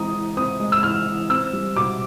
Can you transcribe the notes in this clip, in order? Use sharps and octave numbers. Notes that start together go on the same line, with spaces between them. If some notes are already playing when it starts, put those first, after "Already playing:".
Already playing: E3 G#3 C4 A#5 D#6
E3
C4 D#6
G#3
E6
E3 F6
E3
C4 E6
G3
B2 D6